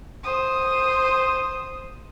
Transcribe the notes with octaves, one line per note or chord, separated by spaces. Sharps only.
C5 D#6